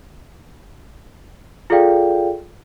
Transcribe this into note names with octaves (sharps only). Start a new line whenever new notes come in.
F4 G#4 A4 D5 F5 G5